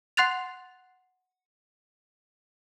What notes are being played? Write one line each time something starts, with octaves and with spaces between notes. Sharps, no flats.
F#5 C6 F#6 A6 F7